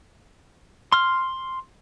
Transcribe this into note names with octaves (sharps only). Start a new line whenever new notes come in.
C6 F6